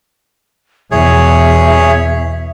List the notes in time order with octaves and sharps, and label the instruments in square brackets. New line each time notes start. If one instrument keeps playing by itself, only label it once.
[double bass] E2 B2 [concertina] G#4 C#5 [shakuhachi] E5